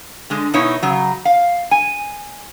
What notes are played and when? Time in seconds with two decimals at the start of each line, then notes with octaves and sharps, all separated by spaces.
0.30 D3 G#3
0.54 B2 D#4 E4 C#5
0.83 C#3 F#3
1.25 F5
1.71 G#5